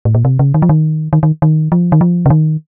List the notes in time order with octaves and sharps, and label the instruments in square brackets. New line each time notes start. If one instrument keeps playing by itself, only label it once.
[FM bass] A2
A#2
C3
C#3
D#3
F3
D#3
D#3
D#3
D#3
F3
D#3
F3
C#3
D#3